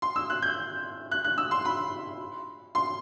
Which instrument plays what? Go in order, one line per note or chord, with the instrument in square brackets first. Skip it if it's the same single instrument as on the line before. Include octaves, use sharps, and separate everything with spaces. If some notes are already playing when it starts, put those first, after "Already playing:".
[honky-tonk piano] C6
E6
F#6
G6
F#6
F#6
E6
C6
B5
C6